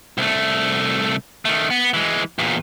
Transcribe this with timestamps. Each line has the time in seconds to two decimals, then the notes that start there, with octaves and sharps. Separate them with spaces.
0.18 C2 A3
1.45 D#3 A3
1.71 B3
1.94 E3 G#3
2.39 E2 A#2